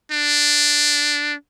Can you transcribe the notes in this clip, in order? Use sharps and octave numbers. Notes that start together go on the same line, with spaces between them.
D4